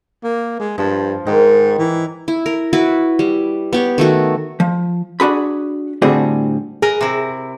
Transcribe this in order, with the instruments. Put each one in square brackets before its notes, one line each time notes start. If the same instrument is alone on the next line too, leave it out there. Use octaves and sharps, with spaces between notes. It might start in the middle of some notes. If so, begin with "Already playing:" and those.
[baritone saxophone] A#3
G#3
[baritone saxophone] G2 [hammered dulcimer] F3
[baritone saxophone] G#2 [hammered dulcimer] D#3
[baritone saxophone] E3
[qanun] E4
A#4
E4 F#4 B4
G3
B3 G4 C#5
D#3 A3 F#4
[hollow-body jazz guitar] F3
D4 F#4 G#4 B5
A2 D3 G3 C4 F#4 G#4
[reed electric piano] G#4 [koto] A#4 B4 D#5
[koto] C3 E4